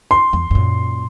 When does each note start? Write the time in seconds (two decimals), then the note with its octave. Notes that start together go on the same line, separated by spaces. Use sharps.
0.11 C6
0.33 E2
0.51 F#2 A#2